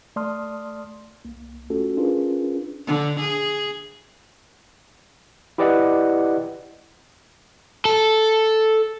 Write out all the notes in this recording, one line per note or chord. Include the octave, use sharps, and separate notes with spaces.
A3 D5 A5 C6 D#6 F6
C2 A#3
A3 C#4 F4 F#4 A4
C#4 D4 F4 G#4 A#4 B4
D3
G#4
E4 G4 B4 D5 D#5 F#5
A4